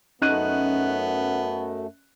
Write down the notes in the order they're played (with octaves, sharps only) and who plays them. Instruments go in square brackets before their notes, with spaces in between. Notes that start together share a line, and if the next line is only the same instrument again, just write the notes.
[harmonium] F#2 A3 [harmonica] B3 [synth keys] C#4 [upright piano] D#4 F#6 D#7